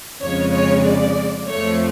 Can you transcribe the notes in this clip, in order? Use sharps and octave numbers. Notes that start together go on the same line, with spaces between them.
F2 C#3 G#3 C#5
C#5
D5
F2 F3 A3 C#5